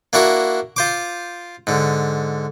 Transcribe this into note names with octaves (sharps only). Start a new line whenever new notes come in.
A#3 D4 E4 F#4 A#4
F4 C5 D6
G#2 D3